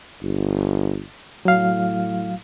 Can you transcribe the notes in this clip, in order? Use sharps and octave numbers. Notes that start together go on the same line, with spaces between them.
G1
A2 F#3 F5